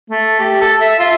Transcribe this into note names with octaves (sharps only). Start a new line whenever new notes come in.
A3
G4
A4
E5
F4